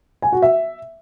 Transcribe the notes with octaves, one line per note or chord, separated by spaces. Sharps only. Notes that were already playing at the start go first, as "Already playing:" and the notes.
G#5
F#4
E5